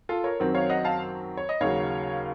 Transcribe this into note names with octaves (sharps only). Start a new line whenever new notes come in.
F4 A4
A#4 C#5
F#2 D#3 F#3 C4
C#5 F5
D#5 F#5
F5 A5
C#5
D#5
D#2 C#3 F#3 C#5 F5